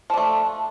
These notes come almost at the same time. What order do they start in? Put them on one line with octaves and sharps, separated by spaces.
F3 D4 A3